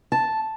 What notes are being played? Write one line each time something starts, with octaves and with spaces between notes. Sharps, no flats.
A5